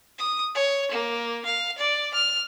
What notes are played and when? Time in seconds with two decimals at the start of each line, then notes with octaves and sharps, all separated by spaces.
0.18 D#6
0.54 C#5
0.91 A#3
1.45 F5
1.78 D5
2.14 F6